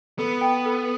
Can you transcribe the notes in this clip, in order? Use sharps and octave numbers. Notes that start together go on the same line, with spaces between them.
B3 A4
G5
A4